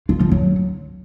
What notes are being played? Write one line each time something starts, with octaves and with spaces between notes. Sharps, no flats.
F4
F3
F#3